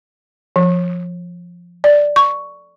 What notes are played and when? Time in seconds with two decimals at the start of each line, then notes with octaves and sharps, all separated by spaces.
0.56 F3
1.84 D5
2.16 C#6